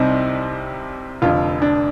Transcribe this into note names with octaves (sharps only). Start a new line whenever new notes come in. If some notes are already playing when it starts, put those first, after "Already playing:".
Already playing: C2 C3 G3 C4 D#4
F1 F2 D3 F4
D4